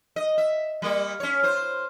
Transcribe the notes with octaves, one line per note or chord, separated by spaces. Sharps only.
D#5
E5
G3 A#3
C#4 C#5
F4 C5